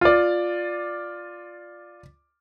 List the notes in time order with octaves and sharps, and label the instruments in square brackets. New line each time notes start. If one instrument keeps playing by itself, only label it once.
[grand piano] F4 D5